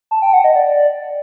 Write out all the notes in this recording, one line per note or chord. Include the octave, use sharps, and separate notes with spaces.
A5
G5
F#5
D#5
D5